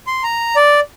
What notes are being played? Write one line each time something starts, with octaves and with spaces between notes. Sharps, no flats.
C6
A#5
D5